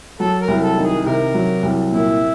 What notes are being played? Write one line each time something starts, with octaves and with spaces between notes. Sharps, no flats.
F#3 A4
A#4
C2
A4
D#3
G#4
C3 A#4
F#3
C2
A#2 E4